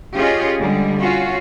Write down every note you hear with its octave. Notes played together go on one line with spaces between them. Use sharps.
C#4 F4 G4 G#4 C#5 D#5
D3 G3 G#3
C#4 F4 F#4